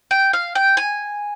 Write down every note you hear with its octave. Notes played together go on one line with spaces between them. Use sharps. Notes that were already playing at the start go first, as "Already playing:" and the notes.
G5
F5
G5
G#5